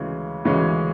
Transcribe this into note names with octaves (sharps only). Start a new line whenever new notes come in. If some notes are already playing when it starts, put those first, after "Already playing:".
Already playing: D2 C#3 E3 G#3 C#4
D2 C#3 E3 G#3 C#4